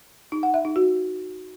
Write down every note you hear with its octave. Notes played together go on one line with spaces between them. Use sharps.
D#4
F#5
E5
D#4
F#4